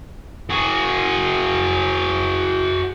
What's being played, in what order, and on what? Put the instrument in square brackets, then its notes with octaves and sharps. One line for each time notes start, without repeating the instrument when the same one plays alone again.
[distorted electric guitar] F#4 G#4